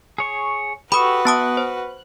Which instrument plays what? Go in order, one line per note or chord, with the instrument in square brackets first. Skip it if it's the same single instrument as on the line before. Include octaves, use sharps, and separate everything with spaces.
[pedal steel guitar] G#4 C#5 C#6
[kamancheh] F#4 B4 [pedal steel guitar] G4 A4 C#6 [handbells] B5 D#6
[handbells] B3 A5 D#6 [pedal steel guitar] F#6
[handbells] C5